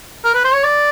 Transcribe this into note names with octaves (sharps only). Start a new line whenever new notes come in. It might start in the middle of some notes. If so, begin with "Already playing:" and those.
A#4
B4
C5
C#5
D5